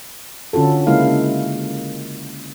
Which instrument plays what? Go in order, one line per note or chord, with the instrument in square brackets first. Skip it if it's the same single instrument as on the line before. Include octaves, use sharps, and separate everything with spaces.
[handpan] D3 C#4 F4 F#4 A4
C#3 G#3 A#3 E4 F5